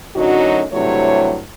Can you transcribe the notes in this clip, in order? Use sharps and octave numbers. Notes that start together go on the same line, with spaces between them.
F#2 A2 D3 F#3 D#4 F#4
G2 C3 F#3 A3 E4 C#5